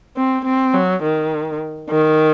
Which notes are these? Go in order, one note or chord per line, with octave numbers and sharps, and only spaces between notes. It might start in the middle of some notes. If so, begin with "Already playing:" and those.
C4
C4
F#3
D#3
D#3